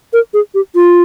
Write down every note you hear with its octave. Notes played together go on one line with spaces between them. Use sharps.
A#4
G#4
G4
F4